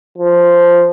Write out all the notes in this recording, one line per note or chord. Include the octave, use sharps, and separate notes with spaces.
F3